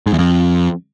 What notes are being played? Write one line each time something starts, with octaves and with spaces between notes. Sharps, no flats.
G#2
E2
F2